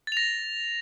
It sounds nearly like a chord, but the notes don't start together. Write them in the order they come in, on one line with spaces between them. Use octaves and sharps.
A6 F7 A#6